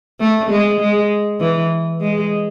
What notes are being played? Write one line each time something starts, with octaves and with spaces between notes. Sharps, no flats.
A3
G#3
G#3
E3
G#3